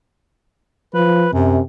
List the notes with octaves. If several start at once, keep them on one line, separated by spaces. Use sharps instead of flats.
F3 B4
F#2 C3